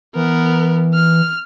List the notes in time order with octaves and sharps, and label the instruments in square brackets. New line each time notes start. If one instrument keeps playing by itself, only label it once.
[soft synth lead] E3 [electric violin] B3 A#4
[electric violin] F6